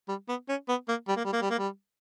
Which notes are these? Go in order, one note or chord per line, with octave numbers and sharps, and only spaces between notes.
G3
B3
C#4
B3
A#3
G3
A#3
G3
A#3
G3
A#3
G3